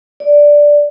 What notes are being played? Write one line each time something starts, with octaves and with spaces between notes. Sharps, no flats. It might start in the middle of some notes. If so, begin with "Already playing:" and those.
D5